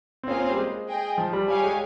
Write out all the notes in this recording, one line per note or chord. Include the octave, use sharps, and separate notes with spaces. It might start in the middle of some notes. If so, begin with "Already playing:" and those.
C4
A#3 C#4 F4 G#4 C5 F5
C4
G3
G#3
G#4 D#5 G5
F3
G3
G3 G4 C#5 F5 G#5
G#3